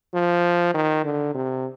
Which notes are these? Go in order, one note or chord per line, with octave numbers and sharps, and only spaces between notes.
F3
D#3
D3
C3